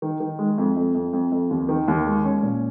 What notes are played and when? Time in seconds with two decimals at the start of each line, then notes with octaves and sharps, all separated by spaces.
0.02 D#3
0.20 D#3
0.39 G#3
0.58 F2
0.76 F2
0.94 F2
1.13 F2
1.32 F2
1.51 D#2
1.69 D#3
1.88 D#2
2.06 G#3
2.25 C#4
2.43 A#2